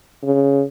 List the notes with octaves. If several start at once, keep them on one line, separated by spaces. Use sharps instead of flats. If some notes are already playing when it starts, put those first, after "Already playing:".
C#3